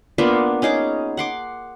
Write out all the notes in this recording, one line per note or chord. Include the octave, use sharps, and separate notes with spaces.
A#3 B3 D4 F4
C#4 D#4 G#4 D6
F#5 C6 D6